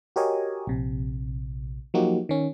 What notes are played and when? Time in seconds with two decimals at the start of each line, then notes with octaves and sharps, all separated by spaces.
0.16 F#4 G4 A#4 C#5 D#5 G#5
0.67 A#1 C3
1.94 F3 F#3 A#3 D#4 F#4 G4
2.29 D#3 C#4